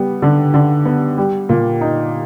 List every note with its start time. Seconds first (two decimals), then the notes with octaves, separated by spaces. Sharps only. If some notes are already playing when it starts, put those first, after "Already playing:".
Already playing: G3 B3
0.22 D3
0.54 D3
0.85 B3
1.18 G3
1.49 A#2
1.81 D#4